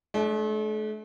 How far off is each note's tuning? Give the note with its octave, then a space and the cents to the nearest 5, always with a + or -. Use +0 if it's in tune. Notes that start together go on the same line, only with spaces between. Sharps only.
A3 -40 D4 +0